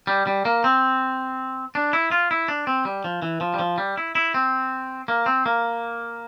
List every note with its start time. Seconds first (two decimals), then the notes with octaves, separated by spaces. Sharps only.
0.07 G3
0.27 G3
0.45 A#3
0.64 C4
1.75 D4
1.93 E4
2.11 F4
2.31 E4
2.48 D4
2.67 C4
2.85 G3
3.04 F3
3.22 E3
3.41 F3
3.54 G3
3.59 F3
3.78 G3
3.97 E4
4.15 E4
4.34 C4
5.08 A#3
5.26 C4
5.46 A#3